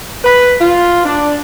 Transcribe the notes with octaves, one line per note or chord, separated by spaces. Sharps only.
B4
F4
D4